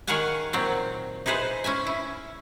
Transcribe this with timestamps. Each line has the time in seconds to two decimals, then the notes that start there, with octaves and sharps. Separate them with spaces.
0.07 D#3 G#4 C#5 F5 F#5 G#5
0.53 A#2 F#3 C4
1.26 D#4 E4 G#4 B4 C5
1.64 C#4 E4 E5 G#5
1.87 E4